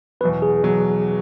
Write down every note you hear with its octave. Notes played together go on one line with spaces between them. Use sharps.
E2 B2 F#3 B4
G#4
E2 B2 F#3